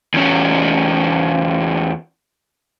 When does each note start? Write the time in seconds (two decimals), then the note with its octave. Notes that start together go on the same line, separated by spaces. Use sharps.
0.14 E2 C#4